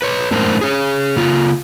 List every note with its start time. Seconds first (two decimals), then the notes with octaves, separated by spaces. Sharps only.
0.02 B4 C#5
0.31 F#2 A2 G#3 D4 A#4 C5
0.61 G#4 C#5
1.17 C#3 A#3 F4